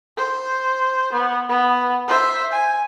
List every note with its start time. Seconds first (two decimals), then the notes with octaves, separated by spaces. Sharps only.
0.17 C5
1.12 B3
1.49 B3
2.08 C5 E5
2.52 G#5